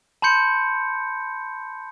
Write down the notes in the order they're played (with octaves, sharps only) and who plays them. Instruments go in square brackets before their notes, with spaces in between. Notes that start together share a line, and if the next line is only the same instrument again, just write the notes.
[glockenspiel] A5 B5 C6 G6 C#7